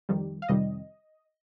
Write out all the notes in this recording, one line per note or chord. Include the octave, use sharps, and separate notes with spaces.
F2 D#3 G3
F5
F2 C3 D#3 G3 D#5